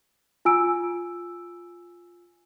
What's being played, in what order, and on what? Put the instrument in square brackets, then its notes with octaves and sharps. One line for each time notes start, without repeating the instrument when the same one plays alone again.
[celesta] F4 G#5 E6 D7